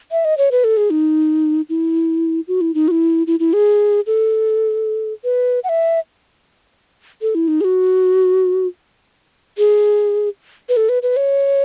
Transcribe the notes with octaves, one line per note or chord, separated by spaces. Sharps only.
E5
D#5
C#5
B4
A4
G#4
D#4
E4
F#4
E4
D#4
F#4
E4
E4
E4
G#4
A4
B4
F#5
E5
A4
E4
D#4
G#4
F#4
G#4
B4
A4
B4
B4
C#5